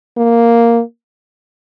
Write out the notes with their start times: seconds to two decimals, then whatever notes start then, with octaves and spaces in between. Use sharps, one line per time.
0.17 A#3